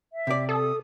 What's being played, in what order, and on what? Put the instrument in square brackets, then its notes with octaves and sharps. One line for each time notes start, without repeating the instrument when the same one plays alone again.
[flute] E5
[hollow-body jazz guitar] C3 D5
[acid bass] A4 [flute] D#6